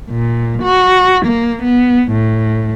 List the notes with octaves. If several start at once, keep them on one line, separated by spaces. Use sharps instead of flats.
A#2
F#4
A#3
B3
A2